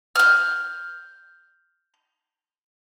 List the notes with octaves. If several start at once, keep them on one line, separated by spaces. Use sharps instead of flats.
F6 G6